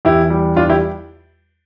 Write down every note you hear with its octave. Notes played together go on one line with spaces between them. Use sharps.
E2 E4 G4
G3
E2 D4 F4
E4 G4